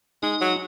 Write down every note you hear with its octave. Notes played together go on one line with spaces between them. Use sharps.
G#3 D#4
F#3